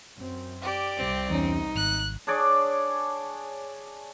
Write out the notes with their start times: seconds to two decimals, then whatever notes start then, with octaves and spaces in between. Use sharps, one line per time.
0.14 F#2 C4
0.62 G4 D5
0.97 C2 C4
1.30 E2 C#4 D#4
1.76 G#1 F#6
2.27 D4 G#4 C#5 D5